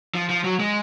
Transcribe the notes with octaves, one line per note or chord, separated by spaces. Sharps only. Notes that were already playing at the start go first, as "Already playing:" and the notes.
F3
F3
F#3
G#3